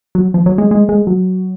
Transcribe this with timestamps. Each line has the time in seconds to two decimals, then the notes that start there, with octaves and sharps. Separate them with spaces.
0.15 F#3
0.34 F3
0.46 F#3
0.58 G#3
0.71 G#3
0.89 G#3
1.07 F#3